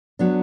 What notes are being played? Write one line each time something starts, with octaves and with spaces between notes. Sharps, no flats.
F#3 B3 D4